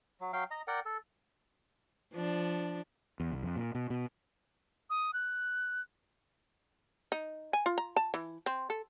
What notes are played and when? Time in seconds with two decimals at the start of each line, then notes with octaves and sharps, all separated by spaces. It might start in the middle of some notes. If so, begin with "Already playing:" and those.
0.20 F#3
0.33 F#3 F5 G5
0.51 D#5 A#5
0.68 A#4 D5 F#5 G5
0.85 A4
2.13 F3 D4
3.20 E2
3.32 C2
3.43 F2
3.56 A#2
3.75 B2
3.90 B2
4.90 D#6
5.14 F#6
7.12 D#4
7.53 G#5
7.66 F4
7.78 A#5
7.96 A5
8.14 E3
8.46 C4
8.70 A4